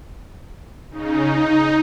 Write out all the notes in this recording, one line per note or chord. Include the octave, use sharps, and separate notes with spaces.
C#3 D#4
D#4